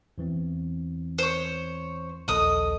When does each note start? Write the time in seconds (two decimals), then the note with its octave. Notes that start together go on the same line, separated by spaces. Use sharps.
0.18 E2 E3 C4
1.19 C5 C#5
2.28 A#1 D#2 A4 D#5 D#6